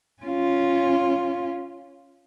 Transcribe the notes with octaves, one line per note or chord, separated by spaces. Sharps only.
C#4 F4